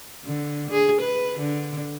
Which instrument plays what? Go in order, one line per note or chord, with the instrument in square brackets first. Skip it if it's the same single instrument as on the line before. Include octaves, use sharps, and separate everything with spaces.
[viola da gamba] D3
G#4
B4
D3